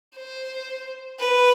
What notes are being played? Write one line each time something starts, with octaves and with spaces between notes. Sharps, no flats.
C5
B4